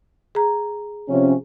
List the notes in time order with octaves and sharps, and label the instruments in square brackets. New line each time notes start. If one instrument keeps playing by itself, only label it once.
[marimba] G#4 A#5
[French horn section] C3 F3 C#4